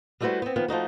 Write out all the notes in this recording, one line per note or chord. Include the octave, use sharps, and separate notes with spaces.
G3 A3 E4 F#4 B4 C5
B3 C4
D#3 F3 B3
F3 A3 D#4 F#4